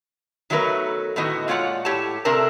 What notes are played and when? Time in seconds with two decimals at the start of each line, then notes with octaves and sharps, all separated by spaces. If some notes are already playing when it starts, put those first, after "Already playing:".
0.50 D#3 F#3 A3 B3 A#4 B4
1.16 A2 D3 D#3 B3 F#4 D#5
1.48 A#2 G#3 F4 C#5 D5 F#5
1.85 A2 G4 C#5 A5
2.25 C3 C4 D4 A4 A#4 A5